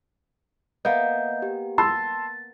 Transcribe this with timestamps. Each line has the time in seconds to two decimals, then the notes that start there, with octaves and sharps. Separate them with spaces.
0.85 A#3 B3 D#5 E5 G6
1.42 G4
1.78 A5 C6 E6 A6